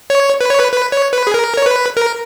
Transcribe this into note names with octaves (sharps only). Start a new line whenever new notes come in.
C#5
B4
C#5
B4
B4
C#5
B4
G#4
A#4
C#5
B4
A#4